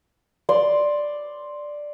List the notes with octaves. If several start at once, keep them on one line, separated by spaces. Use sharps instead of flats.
D5 C6